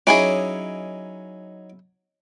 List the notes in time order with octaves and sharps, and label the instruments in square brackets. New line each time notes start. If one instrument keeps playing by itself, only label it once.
[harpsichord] F#3 D#4 D6 [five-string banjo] C#4 E4 G#4